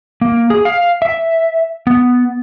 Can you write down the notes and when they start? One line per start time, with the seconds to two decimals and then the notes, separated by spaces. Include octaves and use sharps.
0.21 A#3
0.50 G#4
0.65 F5
1.02 E5
1.87 B3